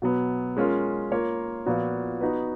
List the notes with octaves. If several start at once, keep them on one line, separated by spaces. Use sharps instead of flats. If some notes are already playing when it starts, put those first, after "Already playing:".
B2 F#3 B3
G#3 C#4 F4 A#4
A#3 F4 A#4 C#5
A#2 F3 B3 F#4
B3 D#4 F#4 B4